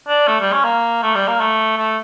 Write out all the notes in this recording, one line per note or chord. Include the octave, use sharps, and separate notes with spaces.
D4
A3
G3
C#4
A#3
A3
G3
A#3
A3
A3